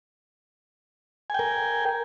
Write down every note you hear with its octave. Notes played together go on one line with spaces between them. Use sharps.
A#4 G5 G#5